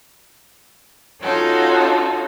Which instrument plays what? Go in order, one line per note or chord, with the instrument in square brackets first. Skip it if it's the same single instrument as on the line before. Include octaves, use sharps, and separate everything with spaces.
[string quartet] C#4 D#4 F4 F#4 A4